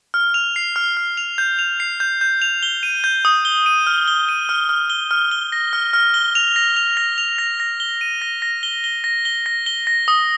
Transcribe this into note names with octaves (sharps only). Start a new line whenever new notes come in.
F6
F7
C7
F6
F6
F7
G6
F7
C7
G6
G6
F7
G7
D#7
G6
D#6
G7
D#7
F6
G7
D#7
F6
F6
G7
F6
G7
A#6
F6
F6
G7
F7
A#6
F7
A#6
F7
A#6
A#6
G7
D#7
A#6
A#6
G7
G7
A#6
G7
A#6
G7
A#6
D#6